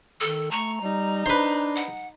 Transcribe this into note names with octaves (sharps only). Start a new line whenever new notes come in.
D#3 A4
A3 A#5 C#6
G3 D#4
D4 B4 C5
F#5